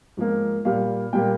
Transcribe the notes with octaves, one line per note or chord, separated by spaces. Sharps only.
G#2 F3 A#3
A#2 G3 A#3 F5
A#2 G3 A#3 G5